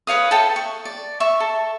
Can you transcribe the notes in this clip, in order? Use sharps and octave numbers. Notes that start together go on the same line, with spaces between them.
B4 C#5 F5 D#6
A4 E5 G5 A5
C#6
D5
E5 C#6
A4